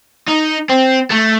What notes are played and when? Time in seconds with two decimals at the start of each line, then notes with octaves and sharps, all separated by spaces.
0.28 D#4
0.69 C4
1.10 A3